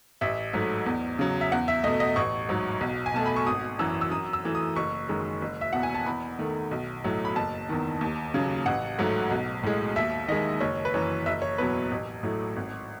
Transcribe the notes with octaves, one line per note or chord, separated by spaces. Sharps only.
A1 E5
G#2 F#3 A3
E2
C#3 F#3
E5
E2 F#5
E5
B2 A3 D#5
D#5
A1 C#6
G#2 F#3
B1
G#5
B2 A3 A5
B5
C#6
G#1 D#6
F#2 E3 E6
E6
F#2 D#6
E6
E3 A3
D#6
F#1 C#6
F#2 D#3 G#3
F#1
E5
E2 B2 F#5
G#5
A5
E2 B5
D#3 A3
B1
A2 F#3 A3
B5
F#1 A5
E2 D#3
D#2
C#3 F#3
A1 F#5
G#2 F#3 A3
B1
A2 G#3
D#2 E5
D#3 G#3 D#5
F#1 C#5
B4
F#2 E3 C#5
F#1 E5
C#5
E2 B2 F#3 B4
A1
A2 F#3 A3
G#1